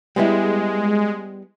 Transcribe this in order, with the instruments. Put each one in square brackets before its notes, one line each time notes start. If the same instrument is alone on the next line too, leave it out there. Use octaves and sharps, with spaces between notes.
[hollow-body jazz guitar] G3 B3 E4 [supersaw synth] G#3